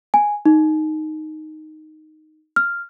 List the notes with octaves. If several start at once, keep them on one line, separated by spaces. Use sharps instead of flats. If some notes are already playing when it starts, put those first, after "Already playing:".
G#5
D#4
F6